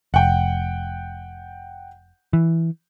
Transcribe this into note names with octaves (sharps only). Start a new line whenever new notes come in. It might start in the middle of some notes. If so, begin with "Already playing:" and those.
F1 F#5 G5
E3